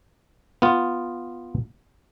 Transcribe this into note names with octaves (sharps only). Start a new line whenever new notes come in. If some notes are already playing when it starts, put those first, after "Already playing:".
B3 F4